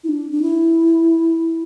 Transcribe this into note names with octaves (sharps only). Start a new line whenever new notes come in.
E4
D4
D4
E4